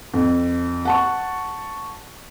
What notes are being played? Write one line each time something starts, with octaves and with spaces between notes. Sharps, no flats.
F2
F#5 A5 C#6